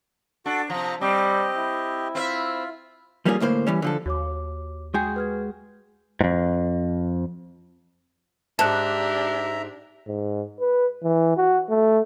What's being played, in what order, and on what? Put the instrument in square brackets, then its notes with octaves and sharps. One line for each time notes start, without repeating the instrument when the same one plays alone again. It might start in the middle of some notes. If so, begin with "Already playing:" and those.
[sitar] D4 [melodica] F#4 A4
[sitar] C3 F3 [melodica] A#5
[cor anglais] G3 [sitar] C4 [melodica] G4 D#5
[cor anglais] E4
[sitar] C4 B4 E5 [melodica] F4
[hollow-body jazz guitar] F3 G3 A#3 C#4 F4 G#4
D2 A2 A#3 C5
E3 G3 C#4
D3 F3 A4
[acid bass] D#2 [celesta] F#4 C#5 D6
[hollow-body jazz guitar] G#3 F#4 G#4 [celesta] G5 G#5 G6
[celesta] B4 F6 G#6
[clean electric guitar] F2 G#2
[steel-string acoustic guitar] G#2 [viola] D4 G4 [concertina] E5 A#5 [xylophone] A5 F#6
[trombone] G#2
B4
E3
F#4
A3